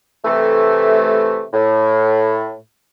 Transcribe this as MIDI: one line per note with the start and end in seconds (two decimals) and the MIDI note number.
0.25 1.43 48
0.25 1.43 52
0.25 1.43 57
1.53 2.54 45